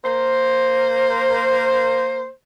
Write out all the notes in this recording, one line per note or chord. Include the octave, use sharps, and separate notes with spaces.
A#3 C5